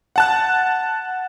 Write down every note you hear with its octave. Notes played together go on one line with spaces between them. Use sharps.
F#5 A5 F#6